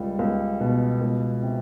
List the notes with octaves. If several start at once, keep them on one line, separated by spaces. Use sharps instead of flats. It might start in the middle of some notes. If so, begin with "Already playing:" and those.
Already playing: C#2 G3
C#2
B2
C#2
C3